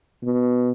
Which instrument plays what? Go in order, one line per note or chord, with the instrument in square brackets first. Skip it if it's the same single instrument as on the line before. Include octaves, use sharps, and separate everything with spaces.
[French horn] B2